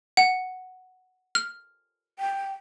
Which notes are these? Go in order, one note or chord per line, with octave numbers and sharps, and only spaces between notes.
F#5
F6
G5